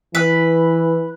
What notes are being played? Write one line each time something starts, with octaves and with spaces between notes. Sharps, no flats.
E3 B4